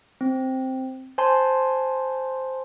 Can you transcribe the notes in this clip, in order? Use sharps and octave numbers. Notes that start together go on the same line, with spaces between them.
C4
C5 G#5 A5 C6